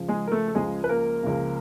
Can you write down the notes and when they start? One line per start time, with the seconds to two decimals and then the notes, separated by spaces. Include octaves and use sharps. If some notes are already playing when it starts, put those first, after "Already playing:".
Already playing: C#2 C#3 F3
0.08 G#3 G#4
0.27 A#4
0.32 A3 A4
0.48 A4
0.55 C#2 C#3 F3 G#3 G#4
0.84 B4
0.89 A#3 A#4
1.23 C#2 C#3 F3